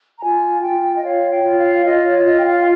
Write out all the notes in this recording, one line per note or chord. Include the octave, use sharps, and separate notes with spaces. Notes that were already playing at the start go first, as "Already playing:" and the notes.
A#5
F4 G#5
F4 G5
D#5
C#5 F5
G5
F4
F5
F4 D#5
C#5
F4 D#5
G5
F5